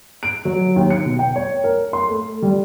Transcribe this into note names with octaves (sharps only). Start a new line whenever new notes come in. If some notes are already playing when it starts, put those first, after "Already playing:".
D7
F#3
D#2
C#7
B2
G5
C#5
A#4
C6
A3
G3